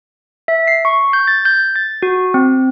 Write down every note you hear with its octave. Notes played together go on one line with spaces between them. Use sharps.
E5
C7
C#6
G6
A6
G6
A6
F#4
C4